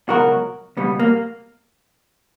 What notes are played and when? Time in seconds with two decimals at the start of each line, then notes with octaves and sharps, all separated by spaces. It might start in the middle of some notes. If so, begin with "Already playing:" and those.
0.09 C#2 B2 F#3 F#4 A#4
0.77 C#2 B2 G3 B3
1.00 A#3